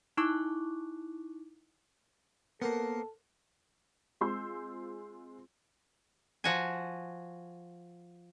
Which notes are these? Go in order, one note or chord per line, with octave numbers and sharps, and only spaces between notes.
D#4 E4 C#6 D6 F#6
A#3 B3 A4 A#4 C5 F#5
G#3 C4 F4 C6 E6 G6
F3 F#4 G#5